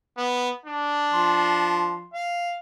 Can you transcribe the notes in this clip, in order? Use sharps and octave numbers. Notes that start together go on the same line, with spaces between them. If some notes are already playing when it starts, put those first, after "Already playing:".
B3
D4
F3 C6
F5